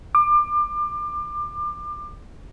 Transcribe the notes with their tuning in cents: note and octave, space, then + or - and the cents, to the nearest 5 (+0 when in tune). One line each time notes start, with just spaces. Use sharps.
D6 +30